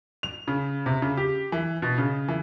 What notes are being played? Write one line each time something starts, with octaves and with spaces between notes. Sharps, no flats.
F7
C#3
C3
C#3
G4
E3
B2
C#3
E3